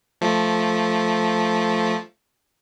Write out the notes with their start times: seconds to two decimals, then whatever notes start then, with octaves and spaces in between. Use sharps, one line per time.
0.21 F3 A3